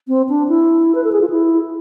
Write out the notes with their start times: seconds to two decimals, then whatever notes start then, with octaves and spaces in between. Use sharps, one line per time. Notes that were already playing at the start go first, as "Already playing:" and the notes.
0.08 C4
0.29 D4
0.49 E4
0.95 B4
1.04 A4
1.12 G#4
1.21 F4
1.30 E4